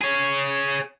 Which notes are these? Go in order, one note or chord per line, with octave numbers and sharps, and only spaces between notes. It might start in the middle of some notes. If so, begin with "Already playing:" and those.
G#4 C#5